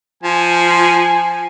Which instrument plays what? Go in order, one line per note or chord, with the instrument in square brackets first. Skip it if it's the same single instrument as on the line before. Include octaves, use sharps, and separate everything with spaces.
[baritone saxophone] F3 [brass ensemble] G#5